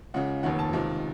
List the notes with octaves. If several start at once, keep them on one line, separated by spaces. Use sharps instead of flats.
C#2 C#3 F#5
F1 D#2 D#3 F#5
A5
C#2 C3 D#3